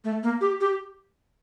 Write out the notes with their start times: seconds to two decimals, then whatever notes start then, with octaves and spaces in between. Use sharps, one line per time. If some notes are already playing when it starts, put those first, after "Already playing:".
0.04 A3
0.23 A#3
0.41 G4
0.61 G4